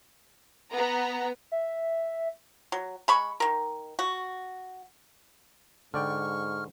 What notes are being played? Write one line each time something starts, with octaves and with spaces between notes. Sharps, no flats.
B3 A#5
E5
F#3
G#3 B5 C#6
D#3 A#4
F#4
G#2 D3 D5 G5 C#6 F6